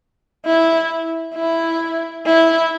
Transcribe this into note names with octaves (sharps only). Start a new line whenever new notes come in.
E4
E4
E4